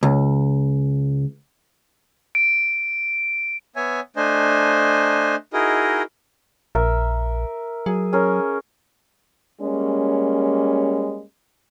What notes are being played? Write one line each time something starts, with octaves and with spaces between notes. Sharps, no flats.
C#2
D7
B3 C#5 E5 G#5
A3 D4 C5 D#5 G#5
D#4 E4 F#4 G#4 A#4 D#5
A#1 A#4 E5
F#3 G#4
C#4 G#4 A#4
G3 G#3 A#3 C#4